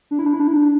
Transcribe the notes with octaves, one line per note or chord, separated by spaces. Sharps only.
D4
E4
D4
E4
D4
E4
D4